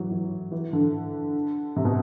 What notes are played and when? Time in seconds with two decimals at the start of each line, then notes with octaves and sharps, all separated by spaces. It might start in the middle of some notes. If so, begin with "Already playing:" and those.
Already playing: E3 F#3
0.11 E3
0.52 E3
0.73 D3
1.76 C3
1.85 B2